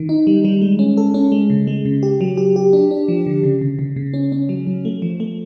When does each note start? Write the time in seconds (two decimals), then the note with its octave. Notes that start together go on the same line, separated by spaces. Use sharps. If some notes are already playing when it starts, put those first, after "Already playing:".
Already playing: D#3
0.09 D#4
0.27 G3
0.45 G3
0.61 G#3
0.79 C#4
0.98 A4
1.14 C#4
1.32 G#3
1.50 C#3
1.67 G#3
1.85 C#3
2.03 G4
2.21 F#3
2.37 G4
2.56 G4
2.73 D4
2.91 D4
3.08 F3
3.26 D3
3.43 C#3
3.61 C#3
3.79 C#3
3.96 C#3
4.14 C#4
4.32 C#4
4.49 F#3
4.67 F#3
4.85 A3
5.02 F3
5.20 A3